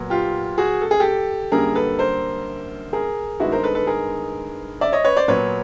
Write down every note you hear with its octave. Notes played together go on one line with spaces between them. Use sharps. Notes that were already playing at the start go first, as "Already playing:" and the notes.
Already playing: A#2 F#3 B3
F4 G4
F#4 G#4
A4
G#4
G4 A4
F#2 D3 G3 A#3 G#4 A#4
A4 B4
A#4 C5
G#4 A#4
G2 D#3 G#3 B3 E4 F#4
A#4 C5
A4 B4
A4 B4
G#4 A#4
D5 E5
C#5 D#5
B4 C#5
C5 D5
A#2 F#3 B3 B4 C#5